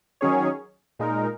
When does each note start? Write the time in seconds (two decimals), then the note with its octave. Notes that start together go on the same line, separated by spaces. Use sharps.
0.21 D#3 F#3 C#4 G#4 C#5
0.99 A#2 G#3 D#4 A#4